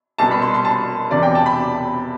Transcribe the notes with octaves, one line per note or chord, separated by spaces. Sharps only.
C2 B2 G3 A5
B5
C6
C6
A5
E1 E2 C3 D5
G5
A5
B5